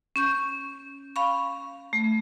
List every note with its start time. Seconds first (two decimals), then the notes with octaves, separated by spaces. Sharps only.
0.16 C#4 C#6 G6
1.16 F5 B5 C#6
1.93 A3